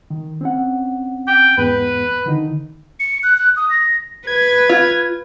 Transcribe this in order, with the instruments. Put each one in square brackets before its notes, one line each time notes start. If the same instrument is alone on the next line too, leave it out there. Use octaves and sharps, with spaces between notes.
[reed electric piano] D#3
C4 C#4 F#5
[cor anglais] G5
[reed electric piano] E2 G#2 B3 [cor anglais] B4
[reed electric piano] D3 D#3 D#4
[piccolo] C#7
F#6
F#6
D#6
A#6
[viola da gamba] B4 [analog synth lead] G#6
[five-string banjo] F4